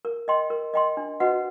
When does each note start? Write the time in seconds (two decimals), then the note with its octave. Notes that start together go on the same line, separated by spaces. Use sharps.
0.05 A#4
0.28 D#5 G5 C6
0.50 A#4
0.74 D#5 G5 C6
0.97 D4
1.20 F#4 B4 D#5 F#5